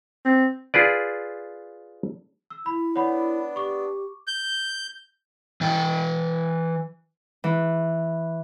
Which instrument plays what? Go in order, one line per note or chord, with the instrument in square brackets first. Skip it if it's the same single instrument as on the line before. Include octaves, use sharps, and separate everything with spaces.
[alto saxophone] C4
[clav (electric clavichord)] F4 G#4 B4 D5
[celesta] E6
[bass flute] E4 [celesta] B5
[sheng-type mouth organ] B3 D4 [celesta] C#5 F#5 B5
[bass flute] G4 [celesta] C#6 D6
[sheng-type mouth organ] G6
[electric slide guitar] E3 G5
[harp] E3